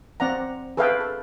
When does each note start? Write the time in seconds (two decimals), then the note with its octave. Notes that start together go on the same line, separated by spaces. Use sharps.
0.20 C4 D5 F#5 A#5
0.77 G#4 A4 B4 E5 F5 G5
1.00 A4